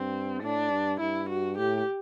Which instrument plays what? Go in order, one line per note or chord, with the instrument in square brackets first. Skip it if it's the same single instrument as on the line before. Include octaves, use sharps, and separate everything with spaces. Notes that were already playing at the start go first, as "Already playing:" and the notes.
Already playing: [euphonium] G2 [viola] C4
[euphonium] A2 [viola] D4
[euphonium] G2
[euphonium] G2 [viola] E4
[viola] F#4
[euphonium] A2 [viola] G4